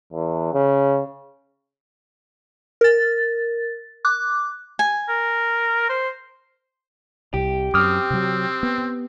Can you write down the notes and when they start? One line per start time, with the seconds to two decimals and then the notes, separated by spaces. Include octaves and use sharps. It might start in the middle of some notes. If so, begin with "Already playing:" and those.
0.13 E2
0.53 C#3
2.81 A#4 A6
4.05 D6 F#6
4.79 G#5
5.09 A#4
5.89 C5
7.34 C2 G4
7.74 F#2 C4 D6 D#6 F6
8.10 C3 F#3
8.63 B3